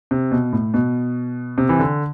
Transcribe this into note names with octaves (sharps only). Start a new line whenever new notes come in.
C3
B2
A2
B2
C3
E3
D3